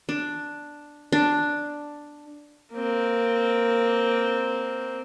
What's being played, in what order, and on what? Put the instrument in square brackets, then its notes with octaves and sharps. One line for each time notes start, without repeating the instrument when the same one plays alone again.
[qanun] D4
D4
[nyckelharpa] A#3 C4